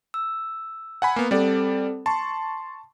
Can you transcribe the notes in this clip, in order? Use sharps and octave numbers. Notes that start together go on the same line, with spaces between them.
E6
F#5 G#5 B5
A#3 B3
G3 C4 A4 D5
A5 C6 C#6